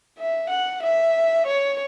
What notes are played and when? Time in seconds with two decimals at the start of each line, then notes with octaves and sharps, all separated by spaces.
0.19 E5
0.50 F#5
0.83 E5
1.47 C#5